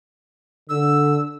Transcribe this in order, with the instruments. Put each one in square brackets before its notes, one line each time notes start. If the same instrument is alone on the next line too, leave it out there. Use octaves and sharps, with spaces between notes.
[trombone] D3 [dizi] E6